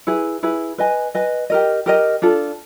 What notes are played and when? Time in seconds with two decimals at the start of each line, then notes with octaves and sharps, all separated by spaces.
0.07 E4 G#4 B4
0.43 E4 G#4 B4
0.78 B4 D#5 G#5
1.15 B4 D#5 G#5
1.50 G4 A#4 D#5
1.86 G4 A#4 D#5
2.22 D4 F4 A4